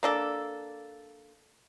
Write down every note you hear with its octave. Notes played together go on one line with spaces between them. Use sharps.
A#3 D4 A4